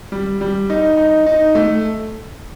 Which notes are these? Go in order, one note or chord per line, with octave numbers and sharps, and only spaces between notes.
G3
G3
D#4
D#4
D#4
A3